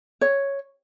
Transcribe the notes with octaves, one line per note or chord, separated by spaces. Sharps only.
C#5